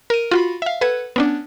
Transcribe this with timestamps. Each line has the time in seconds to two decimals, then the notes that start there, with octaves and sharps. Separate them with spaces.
0.10 A#4 D#7
0.31 F4 F#4 B5
0.62 E5 F5
0.81 A4 B4 F#5 G#6
1.16 B3 C#4 D4